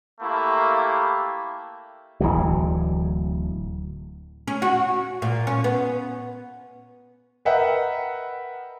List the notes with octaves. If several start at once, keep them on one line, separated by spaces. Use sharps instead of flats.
A3 A#3 E4 G4
D1 G#1 E3 F#3
C#4
F#4
A#2
C#4
B3
A#4 B4 D#5 E5 F#5 G5